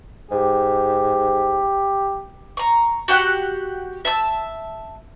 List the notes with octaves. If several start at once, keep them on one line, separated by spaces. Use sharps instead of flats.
G#2 G4
A#5 C#6
F#4 G4 F#5
E5 A5 E6